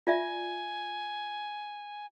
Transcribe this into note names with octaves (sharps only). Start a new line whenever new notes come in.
F4 D5 E5 G#5